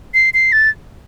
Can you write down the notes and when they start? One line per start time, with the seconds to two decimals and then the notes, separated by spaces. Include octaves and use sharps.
0.14 C7
0.34 C7
0.52 A6